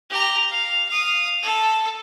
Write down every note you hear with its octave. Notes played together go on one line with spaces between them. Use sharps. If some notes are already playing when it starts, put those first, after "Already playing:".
G4 A#5
F5
F5 D#6
A4